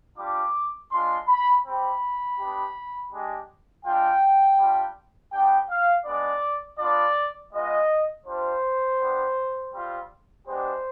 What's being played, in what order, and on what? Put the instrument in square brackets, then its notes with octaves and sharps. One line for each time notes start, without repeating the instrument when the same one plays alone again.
[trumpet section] G3 D4 F4 D6
G#3 D4 F4 C6
B5
C4 G4 B5
B3 D4 G4
G#3 D4 G4
G#3 D4 F4 G5
G3 D4 F4
B3 D4 G4 G5
F5
G#3 B3 D4 D5
B3 D4 F4 D5
G#3 B3 F4 D#5
G3 D4 F4 C5
G3 B3 D4
G3 C4 F4
G#3 B3 D4 G4 C5